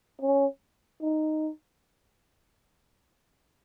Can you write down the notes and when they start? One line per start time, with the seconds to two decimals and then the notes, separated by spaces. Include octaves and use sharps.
0.22 C#4
1.02 D#4